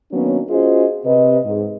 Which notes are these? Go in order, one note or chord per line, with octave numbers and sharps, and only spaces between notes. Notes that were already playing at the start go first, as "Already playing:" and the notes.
D#3 F#3 A#3 B3 C#4 D4
C#4 F4 F#4 G#4 C5 D#5
C3 B4 D#5
G#2